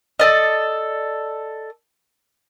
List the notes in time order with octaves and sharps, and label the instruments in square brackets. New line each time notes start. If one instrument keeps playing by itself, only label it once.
[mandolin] A4 D5 D#5